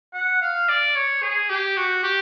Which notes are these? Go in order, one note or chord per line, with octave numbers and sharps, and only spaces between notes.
F#5
F5
D5
C#5
G#4
G4
F#4
G4